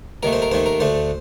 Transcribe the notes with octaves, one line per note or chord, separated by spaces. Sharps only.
D#2 D#3 A3 A#4
C5
A#4
D#2 D#3 A3 C5
A#4
D2 D3 A3 C5